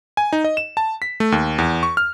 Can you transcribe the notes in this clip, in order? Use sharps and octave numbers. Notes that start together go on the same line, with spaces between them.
G#5
D#4
D#5
E7
A5
B6
A3
D#2
E2
C#6
F6